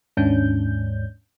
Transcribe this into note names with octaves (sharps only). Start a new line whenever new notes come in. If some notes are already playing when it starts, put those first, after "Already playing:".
D#2 G#2 C#4 D4 G6